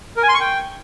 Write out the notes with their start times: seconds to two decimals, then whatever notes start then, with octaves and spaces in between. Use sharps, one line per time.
0.17 A#4
0.23 G#5
0.29 C6
0.34 C#6
0.40 G5